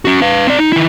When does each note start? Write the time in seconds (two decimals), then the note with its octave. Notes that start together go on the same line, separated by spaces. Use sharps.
0.05 C#4 F#4
0.22 B4 F5
0.47 C4 D5
0.59 D#4
0.73 D#3 E4